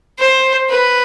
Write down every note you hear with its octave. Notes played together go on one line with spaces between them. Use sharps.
C5
B4